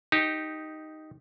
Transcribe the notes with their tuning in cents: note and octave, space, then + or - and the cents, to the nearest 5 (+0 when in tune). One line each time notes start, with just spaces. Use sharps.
D#4 +0 G4 +0